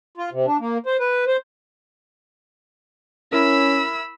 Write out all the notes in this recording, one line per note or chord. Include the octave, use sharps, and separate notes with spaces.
F4
C3
D4
A#3
C5
B4
C5
C#4 E4 A#4 B5 E6